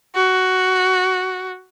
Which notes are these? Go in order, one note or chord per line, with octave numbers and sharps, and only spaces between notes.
F#4